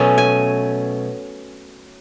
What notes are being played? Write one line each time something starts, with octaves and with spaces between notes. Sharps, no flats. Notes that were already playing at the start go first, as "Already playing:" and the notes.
Already playing: B2 F#3 A3 C#4
G#5